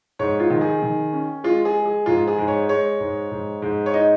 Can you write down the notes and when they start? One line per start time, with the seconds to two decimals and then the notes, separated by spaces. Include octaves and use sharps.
0.19 G#2 C#5
0.40 F4
0.50 D#3
0.61 G#4
0.82 D#3
1.13 C#4
1.44 G#3 F4
1.65 G#4
1.75 G#3
1.86 G#4
2.06 G#2 F4
2.27 G#4
2.38 G#2
2.48 C#5
2.69 G#3 C#5
3.00 G#2
3.31 G#2
3.62 G#2
3.86 C#5
3.94 D#4 D#5